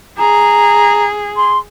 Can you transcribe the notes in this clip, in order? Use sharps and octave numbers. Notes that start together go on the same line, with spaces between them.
G#4 A#5
C6